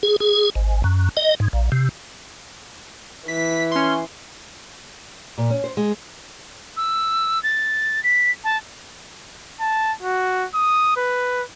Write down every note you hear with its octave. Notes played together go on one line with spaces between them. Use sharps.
G#4
G#4
G#1
F#2
D#5
G#2
A#1
C3
E3 B6
C#4 C6
A#2
C#4
C5
G#3
E6
A6
B6
A5
A5
F#4
D#6
B4